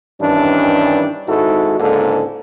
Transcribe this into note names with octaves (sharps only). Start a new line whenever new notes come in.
G2 D#3 E3 C#4 D4
G#1 G#2 D#4 E4 F#4 A4
C#2 G#2 D3 A#3 A4